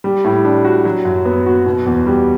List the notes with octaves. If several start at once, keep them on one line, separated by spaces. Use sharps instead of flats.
G3
A2
D4
F#4
F#3
F#2
B3
F#4
B2
E2
G3